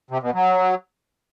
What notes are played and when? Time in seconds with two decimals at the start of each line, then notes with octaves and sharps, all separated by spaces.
0.11 C3
0.22 B2
0.34 F#3